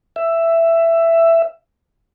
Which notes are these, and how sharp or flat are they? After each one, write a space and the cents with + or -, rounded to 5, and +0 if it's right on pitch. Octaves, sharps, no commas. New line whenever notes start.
E5 +10